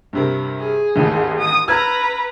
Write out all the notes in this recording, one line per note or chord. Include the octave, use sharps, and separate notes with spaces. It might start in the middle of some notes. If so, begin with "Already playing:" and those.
G2 C3 A#4
G#4
A1 D#2 G#2
D#6
B4 A#5 E6 F6 G#6